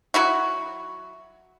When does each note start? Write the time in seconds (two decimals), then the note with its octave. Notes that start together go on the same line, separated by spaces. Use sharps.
0.14 F#3 E4 F#4